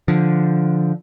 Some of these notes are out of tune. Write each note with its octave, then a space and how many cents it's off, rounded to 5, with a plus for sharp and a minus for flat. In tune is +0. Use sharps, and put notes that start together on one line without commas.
D3 +0 F3 +0